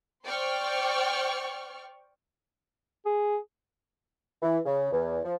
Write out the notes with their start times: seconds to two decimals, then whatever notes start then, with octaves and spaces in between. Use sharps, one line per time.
0.24 C5 D5 G5 C#6 F6
3.05 G#4
4.42 E3
4.65 C#3
4.92 E2
5.24 F3